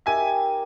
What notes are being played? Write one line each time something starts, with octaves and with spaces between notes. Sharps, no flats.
D#4 G4 A#4 E5 G#5